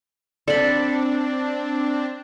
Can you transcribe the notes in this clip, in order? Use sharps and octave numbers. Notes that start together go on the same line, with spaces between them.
C4 D4 A4 D5 B5